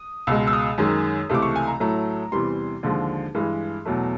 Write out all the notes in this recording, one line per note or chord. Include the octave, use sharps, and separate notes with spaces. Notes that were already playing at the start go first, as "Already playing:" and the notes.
Already playing: D#6
C#2 B2 G#3 E6
E6
D#6
F#2 D#3 G#3
C#2 C3 E3 A3 D6
C#6
G#5
A#5
A2 F#3 A3 A#5
E2 C3 E3 G3 C6
D#2 D3 F3 G#3
G2 E3 G#3
E2 B2 F#3 A3